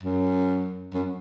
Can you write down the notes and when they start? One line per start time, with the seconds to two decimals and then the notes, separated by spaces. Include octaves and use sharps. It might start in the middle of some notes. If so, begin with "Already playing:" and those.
0.03 F#2
0.94 F#2